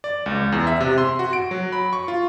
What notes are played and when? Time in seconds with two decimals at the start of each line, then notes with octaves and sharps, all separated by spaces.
0.04 D5
0.26 C#2
0.52 E2
0.67 E5
0.80 C3
0.98 C6
1.19 F#4
1.33 D7
1.51 F#3
1.72 B5
1.93 C#6
2.08 F4